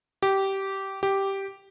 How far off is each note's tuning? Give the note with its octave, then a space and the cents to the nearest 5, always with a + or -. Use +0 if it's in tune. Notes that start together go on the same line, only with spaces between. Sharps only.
G4 -15
G4 -5